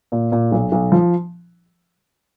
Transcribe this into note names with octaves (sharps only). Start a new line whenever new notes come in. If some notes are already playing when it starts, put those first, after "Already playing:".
A#2
A#2
B1
B1
F3